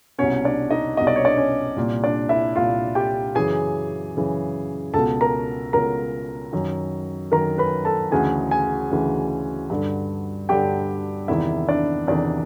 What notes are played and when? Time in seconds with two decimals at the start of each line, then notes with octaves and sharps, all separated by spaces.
0.18 B2 C#4 C#5
0.22 C2
0.44 D4 D5
0.71 D#4 D#5
0.97 C2 B2 D#5
1.07 D5
1.16 C#5
1.24 D4 D5
1.37 C#4 C#5
1.76 C2 A#2
2.04 D4 D5
2.29 E4 E5
2.56 C2 A#2 F4 F5
2.95 G4 G5
3.35 F#2 C#3 E3 G#4 G#5
4.15 F#2 C#3 E3
4.94 C#2 B2 A4 A5
5.21 A#4 A#5
5.73 C#2 B2 A#4 A#5
6.53 F#2 D#3
7.32 F#2 D#3 A#4 A#5
7.58 B4 B5
7.85 A4 A5
8.11 D2 C#3 E3 G#4 G#5
8.51 G#4 G#5
8.91 D2 C#3 E3
9.70 G2 D3
10.49 G2 D3 G4 G5
11.28 E2 C3 D#3 E4 E5
11.68 D4 D5
12.08 E2 C3 D#3 D4 D5